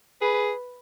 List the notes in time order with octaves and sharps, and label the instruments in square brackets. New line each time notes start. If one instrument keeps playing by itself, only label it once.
[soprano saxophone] G#4 [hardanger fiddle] B4